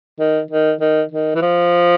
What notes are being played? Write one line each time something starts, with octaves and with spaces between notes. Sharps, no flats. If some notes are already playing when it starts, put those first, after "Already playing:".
D#3
D#3
D#3
D#3
E3
F3